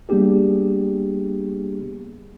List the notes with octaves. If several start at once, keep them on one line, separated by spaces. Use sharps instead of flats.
G3 A#3 B3 D4 G4 G#4